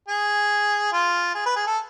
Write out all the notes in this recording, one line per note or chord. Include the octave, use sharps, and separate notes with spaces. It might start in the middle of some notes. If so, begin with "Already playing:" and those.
G#4
F4
G#4
B4
G#4
A4